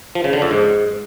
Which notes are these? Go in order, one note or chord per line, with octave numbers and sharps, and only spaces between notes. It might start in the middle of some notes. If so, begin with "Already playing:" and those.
F3
C#3
D3
F2
G#2